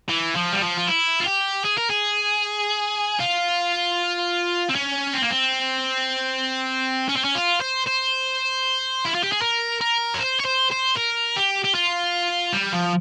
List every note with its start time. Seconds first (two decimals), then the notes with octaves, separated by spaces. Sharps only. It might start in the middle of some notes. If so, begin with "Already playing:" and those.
0.09 E3
0.36 F3
0.52 G3
0.61 F3
0.77 F4
0.87 E4
1.20 F4
1.26 G4
1.64 G#4
1.78 A#4
1.90 G#4
3.20 F4
4.70 C4
4.76 C#4
5.14 C4
5.22 A#3
5.31 C4
7.09 C#4
7.16 C4
7.24 C#4
7.35 F4
7.61 C5
7.86 C5
9.05 E4
9.14 F4
9.23 G4
9.32 G#4
9.41 A#4
9.81 A#4
10.14 C#5
10.19 C5
10.40 C#5
10.45 C5
10.72 C5
10.97 A#4
11.37 G4
11.64 G4
11.75 F4
12.53 G3
12.73 F3